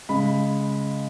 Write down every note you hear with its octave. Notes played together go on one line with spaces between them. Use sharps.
C#3 G#3 B5